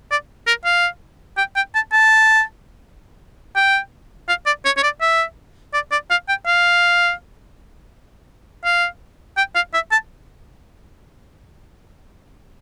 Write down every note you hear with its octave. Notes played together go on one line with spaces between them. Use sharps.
D5
A#4
F5
G5
G5
A5
A5
G5
F5
D5
C#5
C#5
D5
E5
D5
D5
F5
G5
F5
F5
G5
F5
E5
A5